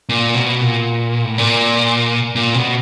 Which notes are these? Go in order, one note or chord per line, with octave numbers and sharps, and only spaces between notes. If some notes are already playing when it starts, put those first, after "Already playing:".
A#2
B2
A#2
A2
A#2
A#2
B2